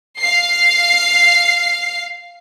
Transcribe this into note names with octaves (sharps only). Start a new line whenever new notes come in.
F5 C7